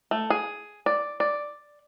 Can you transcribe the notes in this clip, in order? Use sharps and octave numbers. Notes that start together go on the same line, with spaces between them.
A3
G#4
D5
D5